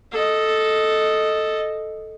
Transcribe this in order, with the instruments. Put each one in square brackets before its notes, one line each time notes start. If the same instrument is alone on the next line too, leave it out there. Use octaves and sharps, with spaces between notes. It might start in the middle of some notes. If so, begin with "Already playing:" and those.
[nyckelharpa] A4 D#5